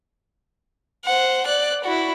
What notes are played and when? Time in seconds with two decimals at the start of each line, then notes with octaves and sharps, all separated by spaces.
1.05 C5 F#5
1.46 D5 F#6
1.84 E4 F#4